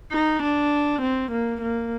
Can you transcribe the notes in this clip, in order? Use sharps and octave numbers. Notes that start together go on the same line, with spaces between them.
D#4
D4
C4
A#3
A#3